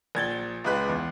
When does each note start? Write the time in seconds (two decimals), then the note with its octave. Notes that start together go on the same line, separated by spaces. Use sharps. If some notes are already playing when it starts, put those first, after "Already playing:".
0.15 A#1 G#6 A6 G7
0.64 C#2 G#3 B4 B5 F#6
0.89 E2